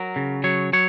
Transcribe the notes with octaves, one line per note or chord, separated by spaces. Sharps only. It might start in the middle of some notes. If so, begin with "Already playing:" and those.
Already playing: F#3 A#4
C#3
F#3 C#5
F#3 C#5